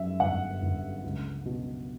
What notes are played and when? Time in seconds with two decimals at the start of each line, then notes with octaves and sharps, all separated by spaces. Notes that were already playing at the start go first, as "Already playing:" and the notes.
Already playing: F#2 E5
0.20 G1 F#5
0.62 G1
1.03 C#2
1.46 B2